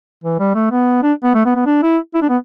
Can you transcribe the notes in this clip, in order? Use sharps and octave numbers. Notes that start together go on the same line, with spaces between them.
E3
G3
A3
B3
D4
B3
A3
B3
B3
D4
E4
E4
D4
B3